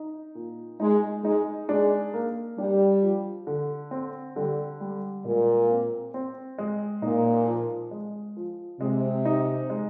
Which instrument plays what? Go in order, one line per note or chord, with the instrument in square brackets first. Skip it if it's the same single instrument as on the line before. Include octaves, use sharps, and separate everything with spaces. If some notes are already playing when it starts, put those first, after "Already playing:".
Already playing: [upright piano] D#4
A#2
[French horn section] G#3 [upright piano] D#4
[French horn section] G#3 [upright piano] D#4
[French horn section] G#3 [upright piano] D4
[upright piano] A#3
[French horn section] G3 [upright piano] D4
[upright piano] F3
D3
C4
[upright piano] D3 [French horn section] G3
[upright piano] G3
[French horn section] A#2 [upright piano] G#3
[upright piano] C4
C4
G#3
[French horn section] A#2 [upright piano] D#4
[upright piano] F3
G#3
F3
[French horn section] C3 [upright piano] G#3
[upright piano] D#4
G#3